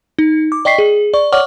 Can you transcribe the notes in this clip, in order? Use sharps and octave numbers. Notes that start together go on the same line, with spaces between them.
D#4
D6
D5 D#5 G5 C#6 B6 C7
G#4
D5 C#6
C#5 D5 F#5 C#6 D6 F6